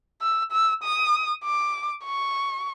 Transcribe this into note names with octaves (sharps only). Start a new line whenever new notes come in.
E6
E6
D#6
D6
C#6